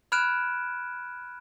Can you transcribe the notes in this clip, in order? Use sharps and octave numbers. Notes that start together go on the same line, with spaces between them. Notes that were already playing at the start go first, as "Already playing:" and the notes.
B5 F6 F#6 G#6 D7 E7